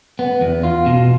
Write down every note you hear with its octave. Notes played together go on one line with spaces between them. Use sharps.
B3
E2
F4
B2